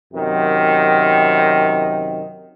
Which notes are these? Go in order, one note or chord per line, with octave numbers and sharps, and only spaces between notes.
F#2 C3 D#3